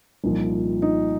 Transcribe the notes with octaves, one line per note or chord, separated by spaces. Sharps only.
C2 A#2 F3 D#4
D#4